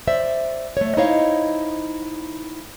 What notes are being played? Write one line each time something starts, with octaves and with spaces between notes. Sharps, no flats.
C5 D5 E5
A3 C#5
D#4 E4 C5 C#5 D#5 F5